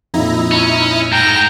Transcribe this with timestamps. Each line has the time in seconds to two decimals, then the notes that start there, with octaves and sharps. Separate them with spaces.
0.14 F2 A#2 D#4 E4 A#5
0.52 C#4
1.12 G#2 G5 A#5